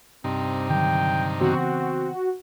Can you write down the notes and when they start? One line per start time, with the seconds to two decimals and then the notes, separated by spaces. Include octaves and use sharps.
0.24 G2 C3 C4 D#4
0.70 D3 D#3 F#3 G5
1.41 C#3 E3 B3 C4 F#4